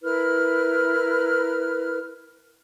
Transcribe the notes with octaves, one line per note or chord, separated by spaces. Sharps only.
E4 A#4 B4 F6